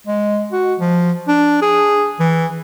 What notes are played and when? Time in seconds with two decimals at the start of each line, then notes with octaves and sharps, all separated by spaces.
0.07 G#3
0.52 F#4
0.80 F3
1.28 D4
1.62 G#4
2.20 E3